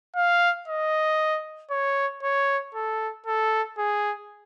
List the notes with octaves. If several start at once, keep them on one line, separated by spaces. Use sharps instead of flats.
F5
D#5
C#5
C#5
A4
A4
G#4